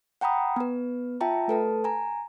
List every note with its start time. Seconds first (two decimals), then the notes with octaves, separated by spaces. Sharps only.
0.21 F#5 G5 A#5 B5 D#6
0.56 B3 B4
1.21 F4 E5 G5 A5 A#5
1.48 A3 A4 B4 A5
1.84 G#5 A#5